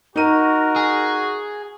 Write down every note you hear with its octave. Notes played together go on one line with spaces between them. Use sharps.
D#4 F#4 A#4 D#7
G#4